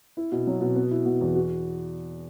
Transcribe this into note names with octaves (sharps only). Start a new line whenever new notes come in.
E4
B2
F#3
B2
B3
E4
B2
E2
F#4